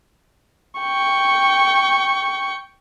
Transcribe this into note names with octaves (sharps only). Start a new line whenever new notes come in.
G5 C#6